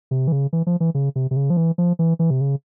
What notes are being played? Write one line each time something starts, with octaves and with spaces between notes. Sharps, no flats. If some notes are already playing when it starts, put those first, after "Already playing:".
C3
E3
C#3
E3
F3
E3
C#3
C3
C3
C#3
F3
E3
F3
E3
E3
C3
C#3